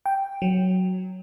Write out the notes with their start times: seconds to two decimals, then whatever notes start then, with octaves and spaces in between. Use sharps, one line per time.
0.06 G5
0.42 F#3